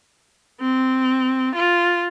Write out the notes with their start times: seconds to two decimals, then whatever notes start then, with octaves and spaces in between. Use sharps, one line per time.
0.61 C4
1.55 F4